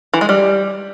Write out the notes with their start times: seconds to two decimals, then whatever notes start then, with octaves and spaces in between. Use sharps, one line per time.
0.14 E3
0.21 G#3
0.29 G3